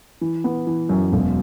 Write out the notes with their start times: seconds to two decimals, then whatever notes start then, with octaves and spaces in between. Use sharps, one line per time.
0.21 E3
0.44 B3
0.67 E3
0.89 F#2
1.12 E1